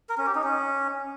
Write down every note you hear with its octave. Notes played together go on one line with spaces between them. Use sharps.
A#4
C#4
G4
D#4
C#4